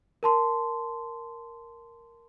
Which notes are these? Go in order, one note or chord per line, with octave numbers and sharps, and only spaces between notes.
A#4 A5 C6